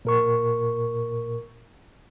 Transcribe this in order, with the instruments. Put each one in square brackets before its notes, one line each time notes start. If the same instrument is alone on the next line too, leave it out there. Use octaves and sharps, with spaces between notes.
[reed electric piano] A#2 A#4 C#6